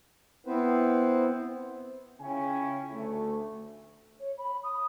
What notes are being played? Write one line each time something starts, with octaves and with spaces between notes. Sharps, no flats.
B3 C4 E4 B4 C5
C#3 C#4 E4 F4 G5 G#5
D2 A3
C#5
B5
D#6